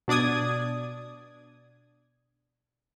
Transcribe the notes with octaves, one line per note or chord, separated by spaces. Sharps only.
B2 D4 D5 D#6 G#6